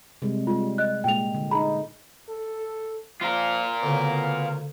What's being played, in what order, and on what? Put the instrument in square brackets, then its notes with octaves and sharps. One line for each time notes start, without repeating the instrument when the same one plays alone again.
[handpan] C3 G3 G#3
[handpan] G3 G#3 [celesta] F4
[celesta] D#5 F#6
[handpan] A#2 G#3 [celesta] G5 F7
[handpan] D3
[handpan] D#4 G#4 [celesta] A#5 B5
[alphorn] A4
[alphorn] F3 [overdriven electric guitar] F4 A#4
[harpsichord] D2 C#3 [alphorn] B3